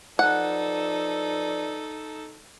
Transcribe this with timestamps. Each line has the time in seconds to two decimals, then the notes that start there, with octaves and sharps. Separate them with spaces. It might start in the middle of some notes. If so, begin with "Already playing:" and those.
0.19 F3 D#4 A4 B4 D5 F#5